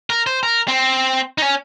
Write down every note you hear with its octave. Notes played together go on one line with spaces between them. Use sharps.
A#4
C5
A#4
C4
D#4
C#4